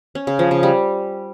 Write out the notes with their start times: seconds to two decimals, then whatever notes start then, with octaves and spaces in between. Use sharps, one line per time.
0.15 C#4
0.27 C#3
0.39 F3
0.51 C#3
0.63 G3